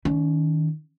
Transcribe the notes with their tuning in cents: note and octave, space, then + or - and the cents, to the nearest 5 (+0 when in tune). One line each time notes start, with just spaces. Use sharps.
D#3 +15 C#4 +40